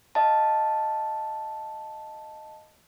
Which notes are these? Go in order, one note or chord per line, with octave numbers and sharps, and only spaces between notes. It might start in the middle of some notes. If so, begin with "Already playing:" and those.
D#5 F5 A5